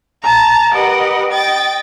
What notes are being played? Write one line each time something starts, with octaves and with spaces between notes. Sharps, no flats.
A5 A#5
G4 A#4 B4 D#5 F#5
D#5 G5 A6